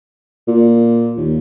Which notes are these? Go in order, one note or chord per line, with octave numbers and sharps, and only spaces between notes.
A#2
D#2